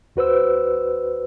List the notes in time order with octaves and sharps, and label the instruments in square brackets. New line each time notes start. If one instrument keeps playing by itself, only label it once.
[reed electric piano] D#2 F#4 B4 C5 E6